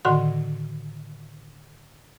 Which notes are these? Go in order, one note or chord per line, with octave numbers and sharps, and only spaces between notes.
A2 D3 D#3 F#4 F#5 C6